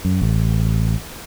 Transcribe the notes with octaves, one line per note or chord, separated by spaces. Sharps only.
F#2
A1